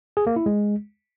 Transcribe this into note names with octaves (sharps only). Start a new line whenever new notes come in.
G#4
A#3
E4
G#3